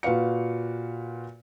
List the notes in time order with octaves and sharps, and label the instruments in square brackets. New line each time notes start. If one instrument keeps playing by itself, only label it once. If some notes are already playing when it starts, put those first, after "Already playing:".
[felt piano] A#2 F#4 B4 F5 C#7